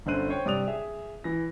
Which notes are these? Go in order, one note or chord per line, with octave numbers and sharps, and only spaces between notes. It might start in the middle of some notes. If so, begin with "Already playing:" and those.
G1 D3 C#4 C5 F#6 D#7
C5 C#5 G5
G2 C3 D5 D#6 F#6 F7
G#4 E5
E3 A#6